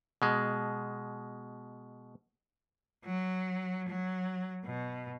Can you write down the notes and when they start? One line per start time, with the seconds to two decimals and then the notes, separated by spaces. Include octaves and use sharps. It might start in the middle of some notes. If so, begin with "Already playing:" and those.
0.22 B2 G#3
3.05 F#3
3.88 F#3
4.66 B2